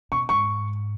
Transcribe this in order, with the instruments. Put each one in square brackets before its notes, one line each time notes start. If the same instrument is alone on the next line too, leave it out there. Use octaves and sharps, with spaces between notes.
[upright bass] B2 [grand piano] C#6
[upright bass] G#2 [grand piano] C#6